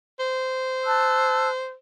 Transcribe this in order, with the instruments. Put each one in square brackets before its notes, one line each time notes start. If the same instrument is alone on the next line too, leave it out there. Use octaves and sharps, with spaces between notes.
[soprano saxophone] C5
[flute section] A5 E6 F#6